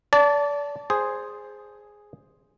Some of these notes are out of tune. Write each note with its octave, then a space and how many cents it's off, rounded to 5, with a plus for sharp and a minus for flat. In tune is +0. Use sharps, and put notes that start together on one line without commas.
D5 -30 A5 +0
G#4 +0 C5 +0